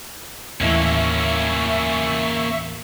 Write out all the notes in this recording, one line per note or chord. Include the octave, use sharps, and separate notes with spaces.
D#2 A2 E3 A#3 C#4 E5 C#6